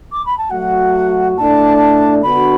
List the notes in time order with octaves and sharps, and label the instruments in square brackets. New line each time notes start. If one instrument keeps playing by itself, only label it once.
[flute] D6
B5
A5
[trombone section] F#3 A3 F#4 [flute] F#5
[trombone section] A2 A3 D4 [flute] A5
[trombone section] D3 B3 D4 F#4 [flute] B5